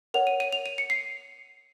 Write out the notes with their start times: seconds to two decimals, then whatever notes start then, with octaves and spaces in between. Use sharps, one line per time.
0.14 A#4 C#5 F#5 F7
0.27 D#7
0.40 D#7
0.53 F7
0.66 D#7
0.78 C#7
0.90 C7